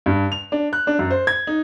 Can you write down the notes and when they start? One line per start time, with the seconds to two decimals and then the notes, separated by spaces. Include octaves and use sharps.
0.06 G2
0.32 F7
0.52 D4
0.73 F#6
0.87 D4
0.99 F#2
1.10 C5
1.27 G#6
1.47 D#4